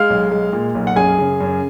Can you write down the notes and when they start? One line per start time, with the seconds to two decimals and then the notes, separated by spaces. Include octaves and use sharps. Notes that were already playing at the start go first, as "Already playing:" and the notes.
Already playing: G#3 F5 F6
0.10 B1
0.31 G#3
0.53 A#2
0.75 B1
0.87 F#5
0.96 F#2 G#4 G#5
1.18 C#3
1.41 F#2